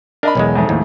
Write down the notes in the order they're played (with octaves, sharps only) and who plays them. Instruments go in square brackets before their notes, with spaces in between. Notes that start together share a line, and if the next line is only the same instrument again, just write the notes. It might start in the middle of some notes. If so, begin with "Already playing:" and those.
[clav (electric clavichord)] D4 [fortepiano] A#4 D#5 B5
[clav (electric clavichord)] B1 E2 G#3
[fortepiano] F2 G#2 A3
[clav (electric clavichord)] D#2 A2